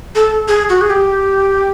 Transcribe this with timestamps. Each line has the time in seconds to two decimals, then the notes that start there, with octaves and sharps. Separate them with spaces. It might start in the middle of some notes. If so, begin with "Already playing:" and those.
0.15 A4
0.48 G#4
0.69 F#4
0.81 G#4
0.90 G4